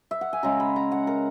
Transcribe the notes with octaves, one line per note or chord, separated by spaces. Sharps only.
E5
F#5
G#5
C#3 G#3 C#4 A#5
B5
A#5
F#5
A#4